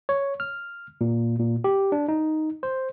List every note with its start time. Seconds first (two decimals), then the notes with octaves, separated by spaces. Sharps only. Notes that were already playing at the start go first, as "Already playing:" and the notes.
0.09 C#5
0.40 F6
1.01 A#2
1.40 A#2
1.64 G4
1.92 D4
2.08 D#4
2.63 C5